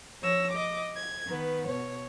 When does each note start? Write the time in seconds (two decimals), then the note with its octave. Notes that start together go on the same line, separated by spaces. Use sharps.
0.21 F3 C#5 E6 A#6
0.51 D#5 D6
0.94 G#6
1.27 D#3 B3 B4
1.65 B2 C#5